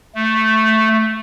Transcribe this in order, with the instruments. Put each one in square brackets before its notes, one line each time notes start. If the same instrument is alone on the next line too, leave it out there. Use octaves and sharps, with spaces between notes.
[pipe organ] A3